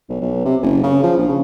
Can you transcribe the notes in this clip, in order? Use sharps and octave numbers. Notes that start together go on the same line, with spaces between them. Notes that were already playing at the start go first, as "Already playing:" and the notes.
B1
B1
C3
F#1
C#3
F3
A#1
C#3